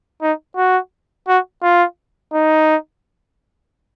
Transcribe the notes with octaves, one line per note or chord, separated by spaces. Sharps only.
D#4
F#4
F#4
F4
D#4